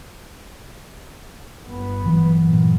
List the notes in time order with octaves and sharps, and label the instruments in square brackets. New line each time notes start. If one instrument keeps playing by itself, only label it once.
[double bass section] G1 B3
[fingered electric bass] G2 E3 F#3
[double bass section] A#2